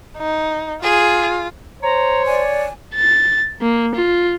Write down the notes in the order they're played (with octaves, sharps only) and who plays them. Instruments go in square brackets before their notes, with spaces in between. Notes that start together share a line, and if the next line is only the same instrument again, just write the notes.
[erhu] D#4
[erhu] F4 [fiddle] G#4
[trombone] C5 [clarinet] C#5 [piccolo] A#5
[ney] D5 [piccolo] G#5
[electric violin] A6
A#3
F4